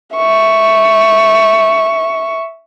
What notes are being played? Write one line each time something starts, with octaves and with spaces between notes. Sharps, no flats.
E5 C#6